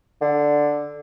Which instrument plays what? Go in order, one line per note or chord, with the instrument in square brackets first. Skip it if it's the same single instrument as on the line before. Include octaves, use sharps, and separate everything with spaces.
[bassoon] D3